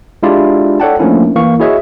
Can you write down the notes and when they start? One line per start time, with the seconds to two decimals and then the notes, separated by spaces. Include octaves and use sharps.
0.23 G#3 D4 E4 F4 G4 D5
0.80 A4 C#5 D5 F#5 G5 A5
0.99 F3 A3 A#3 C#4 D4 E4
1.36 E3 A#3 F5 C#6
1.60 E4 F#4 G#4 C#5 D#5 E5